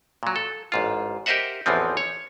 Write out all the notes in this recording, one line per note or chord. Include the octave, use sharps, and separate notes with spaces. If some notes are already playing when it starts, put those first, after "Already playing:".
A#2 F#3
A4
A1 G#2 F4
G4 A#4 C5 D#5 E5 F#5
A1 E2 E3 F3 C4
C#5